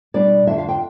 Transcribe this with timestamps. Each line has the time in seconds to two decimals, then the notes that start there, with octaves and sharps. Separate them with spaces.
0.14 B2 G3 D4 D5
0.47 F2 D3 F3 E5
0.58 F5
0.68 G5